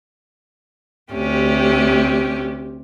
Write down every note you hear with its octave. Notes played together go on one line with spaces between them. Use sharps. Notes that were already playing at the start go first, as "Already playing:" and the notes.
D2 C3 C#4 G4